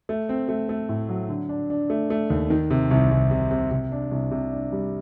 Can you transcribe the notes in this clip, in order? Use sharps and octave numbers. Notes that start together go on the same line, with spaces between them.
A3
C4
A3
A3
A2
F#3
D3
D4
D4
A3
A3
D#2
D#3
C3
C2
C2
C3
C3
C3
D4
C2
C3
D4
G3